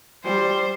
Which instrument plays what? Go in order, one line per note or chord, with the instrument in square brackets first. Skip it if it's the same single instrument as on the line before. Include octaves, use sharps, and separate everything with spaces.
[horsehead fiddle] G3 [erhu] C5